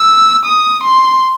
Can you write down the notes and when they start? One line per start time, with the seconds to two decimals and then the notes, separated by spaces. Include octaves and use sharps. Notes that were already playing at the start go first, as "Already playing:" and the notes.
Already playing: E6
0.45 D#6
0.83 C6